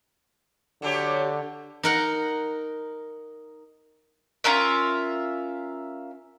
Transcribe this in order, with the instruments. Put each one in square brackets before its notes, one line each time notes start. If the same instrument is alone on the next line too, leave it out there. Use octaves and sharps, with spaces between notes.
[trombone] D3 [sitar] F#3 G4 C#5
[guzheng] D#4 A#4 F#5
[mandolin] C#4 F4 A#4 E5